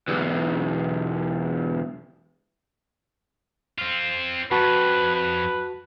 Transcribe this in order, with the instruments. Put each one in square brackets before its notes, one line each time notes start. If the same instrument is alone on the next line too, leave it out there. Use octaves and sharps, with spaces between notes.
[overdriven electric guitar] B1 E2
[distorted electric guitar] C4 F4
[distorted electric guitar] F2 [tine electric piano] F#4 A5 [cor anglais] B4
[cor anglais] B4